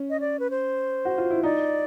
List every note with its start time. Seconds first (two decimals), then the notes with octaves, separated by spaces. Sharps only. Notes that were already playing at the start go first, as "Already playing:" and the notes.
Already playing: C#4
0.10 D#5
0.20 D5
0.40 B4
0.50 C5
1.05 F#4
1.18 F4
1.31 E4
1.43 D#4 D5